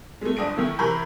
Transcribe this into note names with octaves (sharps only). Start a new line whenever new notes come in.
G#3 A3
G1 D4 D#6 A#6 D7
D#3 A3 E4
C3 E3 A#4 B5 C#6 G6